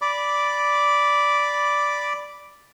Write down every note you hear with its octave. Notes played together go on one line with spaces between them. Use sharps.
D5 B5 D6